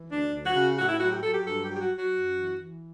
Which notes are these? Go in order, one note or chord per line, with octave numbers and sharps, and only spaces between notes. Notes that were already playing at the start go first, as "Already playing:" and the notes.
Already playing: E3
D2 D4
D2
F#4
C#3
A2 F#4
E4
F#3 F#4
G4
F#3 A4
G4
G2 A4
G4
F#3
G4
F#4
F#3 F#4
F#2
E3
E3